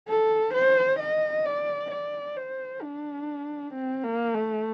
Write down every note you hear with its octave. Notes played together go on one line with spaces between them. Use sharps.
A4
C5
D#5
D5
D5
C5
D4
C4
A#3
A3